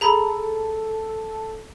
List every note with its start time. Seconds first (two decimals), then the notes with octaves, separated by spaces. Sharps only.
0.01 G#4 A4 A#5 B5